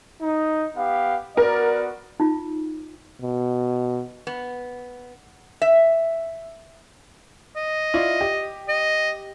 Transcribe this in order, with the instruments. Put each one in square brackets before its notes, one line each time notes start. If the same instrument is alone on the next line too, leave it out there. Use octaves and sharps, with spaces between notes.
[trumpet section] D#4
B3 G4 F5
[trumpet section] B3 F#4 D5 [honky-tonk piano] A#4
[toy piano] D#4 F4
[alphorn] B2
[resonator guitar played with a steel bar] B3
E5
[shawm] D#5
[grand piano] E4 F4 D5
G4
[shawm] D#5